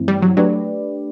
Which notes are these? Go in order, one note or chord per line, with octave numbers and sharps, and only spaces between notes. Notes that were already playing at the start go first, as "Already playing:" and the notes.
Already playing: G2 E3 A3 C4 E4
G3
F#3
F#3 A3 D4 G4 B4 D5